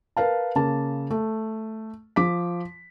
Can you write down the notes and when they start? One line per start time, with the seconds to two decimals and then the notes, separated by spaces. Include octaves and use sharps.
0.17 A#4 B4 F5 A5
0.55 C#3 A#3 A5
1.11 A3
2.16 F3 D6 B6